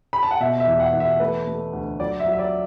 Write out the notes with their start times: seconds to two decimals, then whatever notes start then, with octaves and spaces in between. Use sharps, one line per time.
0.13 B5
0.23 A5
0.31 F#5
0.40 B2 E5
0.60 E5
0.67 E2
0.80 F#5
0.93 E2
1.00 E5
1.20 A3 B4
1.47 A3
1.73 D2
2.00 F#3 D5
2.20 E5
2.26 F#3
2.33 E5
2.39 D5